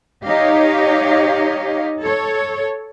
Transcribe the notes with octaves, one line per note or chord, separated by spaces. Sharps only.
D#4 G4 C#5 D#5 F5
A4 C#5